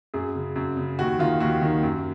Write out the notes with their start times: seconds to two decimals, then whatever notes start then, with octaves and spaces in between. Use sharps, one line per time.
0.14 F#2 G#4
0.35 C#3
0.56 F#2
0.77 C#3
0.99 D#2 F#4
1.19 D#3 F4
1.40 D#2 F#4
1.62 D#3
1.83 F#2